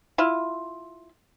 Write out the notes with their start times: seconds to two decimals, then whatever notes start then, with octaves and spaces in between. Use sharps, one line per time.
0.18 E4 F4